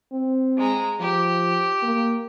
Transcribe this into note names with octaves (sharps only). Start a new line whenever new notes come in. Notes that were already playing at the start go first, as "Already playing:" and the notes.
C4
G#3 A#5
F3 G4
A#3